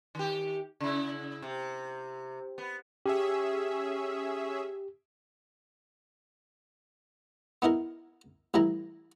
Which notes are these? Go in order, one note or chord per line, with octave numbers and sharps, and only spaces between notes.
D#3 G4
C#3 E4
C3
B3
C#4 G4 G#4 E5
B3 D#4 E4 A#4
A1 E3 G3 E4 A#5